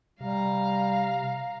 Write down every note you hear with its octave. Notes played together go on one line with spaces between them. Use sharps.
C3 G3 F5 A#5